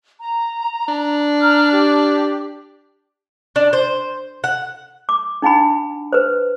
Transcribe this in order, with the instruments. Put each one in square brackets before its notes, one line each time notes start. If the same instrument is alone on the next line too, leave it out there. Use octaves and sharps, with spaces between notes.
[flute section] A#5
[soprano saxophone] D4
[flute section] A#5 F6
G4
[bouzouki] D4
C5
F#5
[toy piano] D6
D4 D#4 F#5 G#5 B5
B4 C5